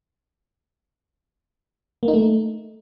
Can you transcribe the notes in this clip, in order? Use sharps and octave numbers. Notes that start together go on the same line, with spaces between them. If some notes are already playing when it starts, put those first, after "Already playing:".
A#3
D#4
A3